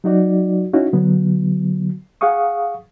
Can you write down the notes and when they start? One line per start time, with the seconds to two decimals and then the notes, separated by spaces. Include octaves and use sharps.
0.04 F#3 D#4 F#4 D5
0.73 C#4 D#4 E4 F#4
0.93 D3 F#3 B3
2.21 G#4 F5 F#5 C#6 D#6